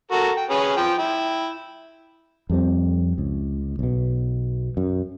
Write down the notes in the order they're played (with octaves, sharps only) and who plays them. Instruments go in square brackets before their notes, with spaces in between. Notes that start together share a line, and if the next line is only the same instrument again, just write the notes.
[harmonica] F#4 A4 A#4
G5
C#4 G#4 B4
F3 G5
E4 G5
[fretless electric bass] F2 G3 C4
C#2
B1 B2
F#2